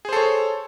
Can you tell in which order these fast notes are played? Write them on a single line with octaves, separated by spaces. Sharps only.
G#4 C5 A4 C#5